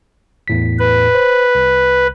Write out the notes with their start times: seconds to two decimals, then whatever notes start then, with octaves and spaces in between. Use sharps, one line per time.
0.48 E2 A2 B6
0.79 B4
1.15 C5
1.55 C2